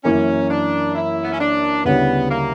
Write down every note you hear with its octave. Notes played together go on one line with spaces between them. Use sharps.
F#2 E3 A#3 C#4
D4
E4
B3
C#4
D4
D2 C#3 G3 B3 C#4 E4
A#3